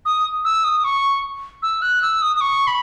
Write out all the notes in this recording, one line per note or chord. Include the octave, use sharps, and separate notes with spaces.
D#6
E6
D#6
C#6
E6
F#6
E6
D#6
D#6
C#6
B5